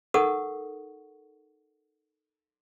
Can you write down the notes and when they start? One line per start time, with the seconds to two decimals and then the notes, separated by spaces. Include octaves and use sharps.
0.14 D#4 A4 A#4 F#5 C#6 D#6